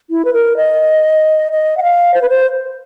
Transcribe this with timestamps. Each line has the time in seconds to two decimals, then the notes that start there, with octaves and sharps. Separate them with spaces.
0.10 E4
0.25 B4
0.33 A#4
0.57 D#5
1.52 D#5
1.77 F#5
1.83 F5
2.14 C5
2.22 B4
2.29 C5